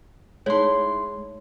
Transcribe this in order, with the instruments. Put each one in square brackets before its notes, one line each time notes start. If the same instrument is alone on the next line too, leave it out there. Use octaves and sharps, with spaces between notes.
[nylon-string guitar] G#3 [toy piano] D#4 C#5 [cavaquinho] E4 C6